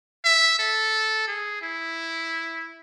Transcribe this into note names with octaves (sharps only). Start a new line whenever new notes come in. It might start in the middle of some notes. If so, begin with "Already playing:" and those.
E5
A4
G#4
E4